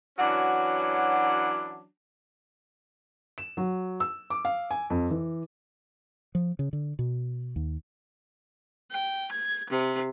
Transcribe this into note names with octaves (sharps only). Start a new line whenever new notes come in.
E3 F#3 C#4 D4 F#4
E7
F#3
E6
D6
F5
G#5
F2
E3
F3
C#3
D3
B2
D#2
G5
G#6
C3